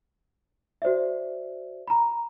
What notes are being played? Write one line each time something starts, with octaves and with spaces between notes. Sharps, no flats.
F#4 C5 D5 E5
A#5 B5